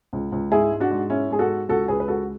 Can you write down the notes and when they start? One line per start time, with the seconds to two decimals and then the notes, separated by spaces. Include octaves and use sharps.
0.13 C#2
0.32 C#2
0.51 G#2 E4 G#4
0.72 G#3
0.80 D4 F#4
0.91 G#2
1.10 G#3 C#4 E4
1.30 G#2 G#4
1.39 F#4 A4
1.49 G#3
1.68 C#2 F#4 A4
1.88 C#2 G#4 B4
2.00 B4
2.08 G#3 F#4 A4